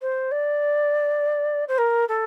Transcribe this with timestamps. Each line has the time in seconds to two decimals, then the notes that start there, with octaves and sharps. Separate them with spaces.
0.02 C5
0.32 D5
1.68 C5
1.78 A#4
2.09 A4